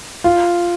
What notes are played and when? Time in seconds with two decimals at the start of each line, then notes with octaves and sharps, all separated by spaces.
0.24 F4